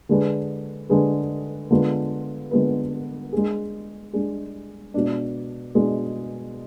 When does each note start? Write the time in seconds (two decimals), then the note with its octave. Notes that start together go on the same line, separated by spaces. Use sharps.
0.09 D3 G#3 D4 G#4 B4
0.89 D3 G#3 D4 G#4 B4
1.71 D3 G#3 B3 F4 B4
2.51 D3 G#3 B3 F4 B4
3.33 G#3 D4 G#4
4.13 G#3 D4 G#4
4.94 B2 G#3 D4
5.75 B2 G#3 D4